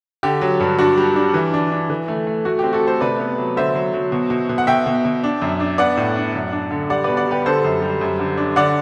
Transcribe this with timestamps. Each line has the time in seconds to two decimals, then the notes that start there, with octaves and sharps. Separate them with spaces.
0.23 D3 G4
0.41 F#3
0.60 G2
0.79 D4 F#4
0.97 G3
1.16 D4
1.34 E3
1.54 D4
1.72 D4
1.90 E3
2.08 A3
2.27 A3
2.45 A3 F#4
2.59 C4 G4
2.73 F#4 A4
2.83 A3 A4 C5
3.00 C3 B4 D5
3.20 B3
3.38 F#3
3.57 D3 C5 E5
3.75 F#3
3.94 F#3
4.12 B2
4.30 B2
4.49 B2
4.58 F#5
4.67 B2 E5 G5
4.86 B2
5.05 B2
5.24 D4
5.42 F#2
5.60 D4
5.78 B3 D5 F#5
5.97 A2
6.16 D4
6.35 F#2
6.53 D4
6.71 D3
6.90 G3 D5 F#5
7.04 B2 B4 D5
7.17 D5 F#5
7.27 G3 G4 B4
7.46 D3 A4 C5
7.65 F#2
7.82 G3
8.01 F#2
8.19 D3
8.37 D4
8.56 D3 D5 F#5